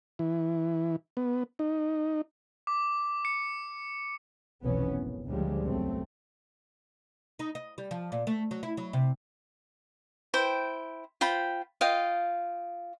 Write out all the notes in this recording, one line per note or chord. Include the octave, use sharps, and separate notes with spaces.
E3
B3
D#4
D6
C#7
F1 B1 B2 E3 B3 C#4
G#1
D2 A#2 C#3 F3 G3 G#3
B1 F#2 A3 C4
D#4
D#5
G3
F3
A#2
A3
F#3
E4
F#3
C3
E4 C5 G5
F4 C5 G5 B5
F4 D#5 F5 G5